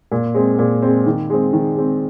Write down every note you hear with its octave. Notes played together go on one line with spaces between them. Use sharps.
A#2
G#3 C4
A#2
G#3 C4
D#3
G#3 C4
D#3
G#3 C4